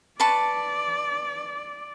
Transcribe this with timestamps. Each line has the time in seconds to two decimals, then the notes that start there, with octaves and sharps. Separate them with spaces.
0.20 B4 D5 A5 C#6